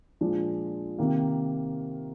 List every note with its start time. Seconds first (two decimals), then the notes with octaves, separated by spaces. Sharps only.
0.21 A#2 F3 G#3 D4
0.98 C3 D#3 A#3